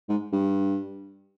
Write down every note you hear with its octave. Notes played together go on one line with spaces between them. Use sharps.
G#2
G2